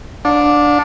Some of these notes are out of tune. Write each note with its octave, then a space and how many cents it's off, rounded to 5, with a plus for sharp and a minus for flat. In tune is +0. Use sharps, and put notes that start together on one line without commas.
D4 +0 F#5 -45